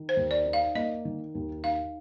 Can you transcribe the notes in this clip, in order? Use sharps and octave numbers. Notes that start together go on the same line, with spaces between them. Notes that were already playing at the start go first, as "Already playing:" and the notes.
Already playing: D#3
C5
D#2
D5
D#4
F5
A#3 D#5
D#3
D#2
D#4 F5